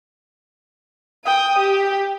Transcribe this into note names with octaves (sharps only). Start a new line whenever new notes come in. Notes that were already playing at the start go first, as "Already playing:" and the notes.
G5 D#6
G4